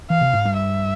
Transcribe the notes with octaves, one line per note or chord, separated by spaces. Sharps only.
E3 F5
C3
G#2
G2
E5